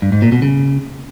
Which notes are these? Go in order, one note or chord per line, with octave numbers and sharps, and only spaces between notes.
G2
G#2
A#2
B2
C#3